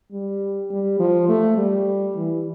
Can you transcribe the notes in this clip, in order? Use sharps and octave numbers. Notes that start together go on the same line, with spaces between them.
G3
G3
F3
A3
G3
E3